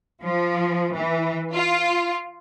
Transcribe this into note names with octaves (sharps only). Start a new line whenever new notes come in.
F3
E3
F4